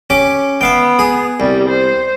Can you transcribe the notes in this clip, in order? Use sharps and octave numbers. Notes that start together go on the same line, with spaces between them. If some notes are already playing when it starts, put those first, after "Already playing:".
C#4 G4 D6
B3 E5 F5 G5
G#4
C2 G3
C5